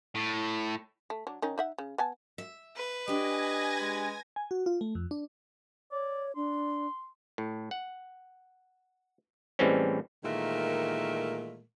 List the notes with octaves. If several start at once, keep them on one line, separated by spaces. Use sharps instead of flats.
A2
A3
F#3 D4
D#3 C#4 D#4
D#4 E5 F#5
C#3
B3 G#5 A5
E5
B4
D4 G4 D#5 G#5 G#6 A#6
G#3
G#5
F#4
F4
A3
F2
D4
C#5 D5
D4 C6
A2
F#5
A2 E3 G3 G#3 C4 C#4
A#2 D#3 E3 G#3 A3 A#4